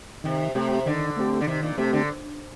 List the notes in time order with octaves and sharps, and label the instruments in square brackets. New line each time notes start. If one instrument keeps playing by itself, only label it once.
[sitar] C3 [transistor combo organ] D#3
[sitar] C3 [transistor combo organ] A3 C4 G4
[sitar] D3 [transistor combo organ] D#3
[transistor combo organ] A3 C4 G4
[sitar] D3
[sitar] C3 [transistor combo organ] D#3
[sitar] A#2
[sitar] C3 [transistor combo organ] A3 C4 G4
[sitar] D3